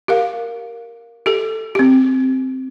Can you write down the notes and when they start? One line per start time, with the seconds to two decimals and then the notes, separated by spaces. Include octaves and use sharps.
0.08 G4 A#4 F5
1.26 G4 A4
1.75 C4 G4